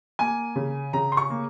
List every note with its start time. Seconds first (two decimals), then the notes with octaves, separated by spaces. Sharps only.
0.19 A#3 G#5
0.56 C#3
0.93 C#3 A#5
1.12 C6
1.17 C#6
1.30 A#3